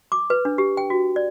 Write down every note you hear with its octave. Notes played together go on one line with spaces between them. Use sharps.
D6
B4
D4
G4
G5
F#4
D5